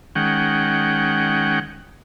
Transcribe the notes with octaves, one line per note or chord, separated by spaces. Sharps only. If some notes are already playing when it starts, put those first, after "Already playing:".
D#3 G#3 C#4 F#5 G5